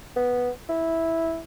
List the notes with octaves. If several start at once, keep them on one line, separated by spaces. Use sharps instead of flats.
B3
E4